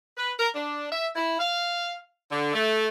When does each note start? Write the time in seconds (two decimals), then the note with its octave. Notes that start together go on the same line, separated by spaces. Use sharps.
0.17 B4
0.40 A#4
0.55 D4
0.91 E5
1.16 E4
1.40 F5
2.32 D3
2.53 A3